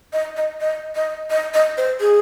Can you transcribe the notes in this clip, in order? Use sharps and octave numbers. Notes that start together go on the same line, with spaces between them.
D#5
D#5
D#5
D#5
D#5
D#5
C5
G#4